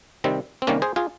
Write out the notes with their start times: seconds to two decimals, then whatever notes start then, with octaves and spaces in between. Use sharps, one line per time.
0.24 C3 D#3 G3 C4
0.62 C4
0.67 C3 D#3 G3 A#3 C#4
0.82 G#4 C5
0.96 F4 G#4